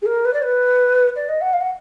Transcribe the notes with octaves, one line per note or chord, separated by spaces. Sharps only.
G#4
A#4
B4
D5
B4
D5
D#5
F#5
F5
F#5